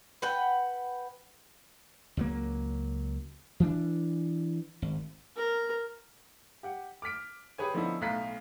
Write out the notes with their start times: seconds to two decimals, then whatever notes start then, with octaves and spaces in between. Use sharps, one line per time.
0.22 B4 F#5 G5
2.17 C#2 F#3 A#3
3.60 E3 D4
4.82 G#1
5.36 A#4
6.63 G4 F#5
7.02 D6 F6 B6 D7
7.58 G4 G#4 B4 C#5 G#5
7.74 D3 F3 B3 C#4 D#4 E4
8.01 B1 A2 F5 A#5 F#6 B6